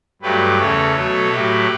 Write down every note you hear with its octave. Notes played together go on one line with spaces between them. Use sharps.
G2 F#3 A3 G4 B4
E2 C#3 E3 A3 A4 C#5
B2 F#3 A3
A2 F#3 A3 G4 B4